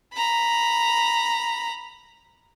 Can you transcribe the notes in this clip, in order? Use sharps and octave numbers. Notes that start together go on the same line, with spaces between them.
A#5 B5